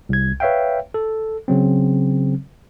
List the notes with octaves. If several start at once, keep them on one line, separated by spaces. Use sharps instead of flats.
C2 G#6
B4 C#5 E5 F5 G5
A4
C#3 F#3 C4